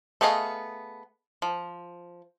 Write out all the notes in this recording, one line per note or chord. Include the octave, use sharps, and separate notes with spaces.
A3 B3 G#4 D#5 F5
F3